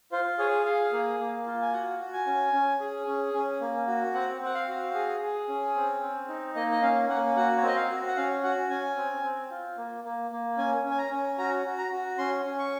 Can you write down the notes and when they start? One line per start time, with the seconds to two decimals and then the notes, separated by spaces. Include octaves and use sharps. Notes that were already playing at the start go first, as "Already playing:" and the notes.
0.12 F4 C5
0.39 G#4 C#5
0.65 G#4 F5
0.92 A#3
1.19 A#3
1.46 F4
1.62 G#5
1.73 F#4 F#5
1.99 F#4
2.13 G#5
2.27 C#4
2.53 C#4
2.80 G#4
3.07 C#4
3.34 C#4
3.61 A#3
3.87 F#4
4.14 C4 F#5
4.41 C4 F#5
4.55 F5
4.68 F#4
4.94 G#4
5.22 G#4
5.48 C#4
5.76 C4
6.02 C4
6.29 D#4
6.55 A#3 D#5
6.72 D#5
6.82 C#4 F5
7.09 A#3 F#5
7.36 F#4 F#5
7.57 C#5
7.62 C4 D#5
7.76 F5
7.89 F#4
8.08 F#5
8.17 C#4 F5
8.43 F#4 F#5
8.70 C#4 G#5
8.97 C4
9.23 C4
9.51 F4
9.77 A#3
10.04 A#3
10.31 A#3
10.58 C#4 G#5
10.85 C#4
10.91 G#5
10.98 A#5
11.11 C#4
11.38 F#4 A#5
11.65 F#4
11.78 A#5
11.92 F#4
12.18 C#4 C6
12.45 C#4
12.59 C#6